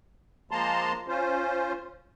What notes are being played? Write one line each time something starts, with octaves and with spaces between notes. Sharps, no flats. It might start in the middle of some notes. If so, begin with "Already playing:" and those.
F3 G#3 A#3 A5 A#5 C6
C#4 F4 C5